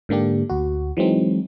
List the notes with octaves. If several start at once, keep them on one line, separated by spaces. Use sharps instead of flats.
G#2 D3 A#3 D4 G4
D2 F#4
E3 F#3 G#3 C4 D#4